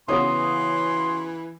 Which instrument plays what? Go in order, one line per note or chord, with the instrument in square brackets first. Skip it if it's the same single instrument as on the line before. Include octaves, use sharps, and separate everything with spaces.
[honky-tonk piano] C#3 C#4 F#4 [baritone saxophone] E3 [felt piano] B3 G#4 D#6 [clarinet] C6